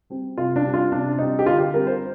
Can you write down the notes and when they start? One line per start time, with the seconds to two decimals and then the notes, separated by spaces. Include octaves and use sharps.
0.10 G3 C4
0.37 C3 F4
0.56 D4
0.65 G3 C4
0.74 F4
0.92 C3 D4
1.18 G3 C4 D#4
1.39 G4
1.46 D3 F4
1.60 G4
1.73 G3 C4 A#4
1.87 C5